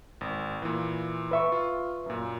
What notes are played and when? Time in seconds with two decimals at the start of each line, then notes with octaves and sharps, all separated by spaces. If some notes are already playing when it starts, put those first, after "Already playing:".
0.21 G#1
0.62 A#2 E3
1.31 B4 E5 C#6
1.52 F4
2.06 F#2 A#2